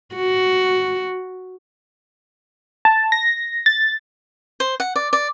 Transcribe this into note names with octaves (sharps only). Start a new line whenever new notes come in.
F#4
A5
A#6
A6
C5
F#5
D5
D5